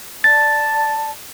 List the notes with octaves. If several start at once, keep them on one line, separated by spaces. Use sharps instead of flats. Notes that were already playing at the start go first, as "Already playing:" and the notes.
D5 A5 A6